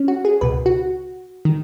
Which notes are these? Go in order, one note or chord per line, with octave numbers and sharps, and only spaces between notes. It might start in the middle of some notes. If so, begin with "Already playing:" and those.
Already playing: C#4
F#4
G#4
C#2 B2 B4
F#4
D#3